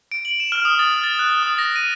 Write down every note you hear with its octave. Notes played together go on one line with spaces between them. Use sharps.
D7
F#7
E7
F6
D#6
A6
F6
A6
F#6
D#6
A#6
D#7